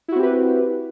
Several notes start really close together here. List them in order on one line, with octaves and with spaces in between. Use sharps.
E4 F#4 C4 G4 B4